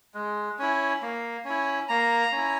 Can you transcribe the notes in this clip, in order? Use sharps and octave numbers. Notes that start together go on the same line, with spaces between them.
G#3
C#4 E4
A#3
C#4 E4
A#3 A#5
C#4 E4